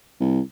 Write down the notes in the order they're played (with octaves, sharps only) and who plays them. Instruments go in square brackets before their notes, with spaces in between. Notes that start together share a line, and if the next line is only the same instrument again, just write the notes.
[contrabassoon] C2